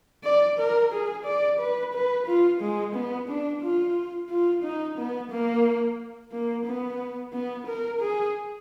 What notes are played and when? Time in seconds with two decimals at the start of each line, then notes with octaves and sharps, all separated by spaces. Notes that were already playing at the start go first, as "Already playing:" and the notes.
0.24 D5
0.59 A#4
0.92 G#4
1.25 D5
1.60 B4
1.93 B4
2.27 F4
2.60 G#3
2.95 B3
3.28 D4
3.62 F4
4.30 F4
4.63 D#4
4.97 B3
5.31 A#3
6.32 A#3
6.66 B3
7.33 B3
7.67 A#4
8.01 G#4